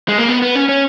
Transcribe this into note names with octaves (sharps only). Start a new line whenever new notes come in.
G#3
A#3
B3
B3
C#4
C#4